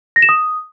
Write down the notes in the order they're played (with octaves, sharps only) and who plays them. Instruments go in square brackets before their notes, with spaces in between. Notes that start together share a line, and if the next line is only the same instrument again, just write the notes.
[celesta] A#6
E7
D#6